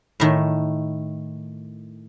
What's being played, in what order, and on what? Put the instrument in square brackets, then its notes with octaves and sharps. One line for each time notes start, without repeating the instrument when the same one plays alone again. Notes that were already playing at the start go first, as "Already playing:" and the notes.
[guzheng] A2 D#3 A3